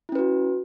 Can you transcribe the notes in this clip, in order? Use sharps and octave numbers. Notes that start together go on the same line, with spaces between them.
C#4 E4 F#4 B4